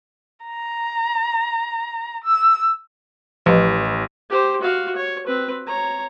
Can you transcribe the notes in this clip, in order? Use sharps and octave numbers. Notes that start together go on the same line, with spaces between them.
A#5
E6
A1 F3 G4 B4 D#5
G4 C5
F#4 F5
C#5
C4 B4
C#5 A#5